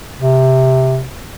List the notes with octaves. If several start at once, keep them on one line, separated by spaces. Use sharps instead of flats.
C3